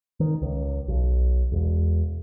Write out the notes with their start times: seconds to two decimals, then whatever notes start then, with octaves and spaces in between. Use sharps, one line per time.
0.20 D#3
0.42 C#2
0.88 B1
1.52 E1